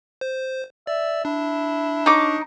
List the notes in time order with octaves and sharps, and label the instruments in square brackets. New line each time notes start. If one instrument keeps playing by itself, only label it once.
[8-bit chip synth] C5
[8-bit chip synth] D5 [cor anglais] E5
[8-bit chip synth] D4 [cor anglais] E4
[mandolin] D#4 D6 [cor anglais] C#5